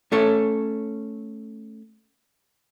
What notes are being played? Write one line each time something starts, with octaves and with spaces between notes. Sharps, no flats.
A3 C#4 A4 C#5